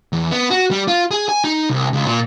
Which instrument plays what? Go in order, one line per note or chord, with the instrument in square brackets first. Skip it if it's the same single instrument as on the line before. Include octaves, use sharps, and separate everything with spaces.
[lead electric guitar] E2
B3
F#4
G3
F4
G#4
G#5
D#4
C2
C#2
A#2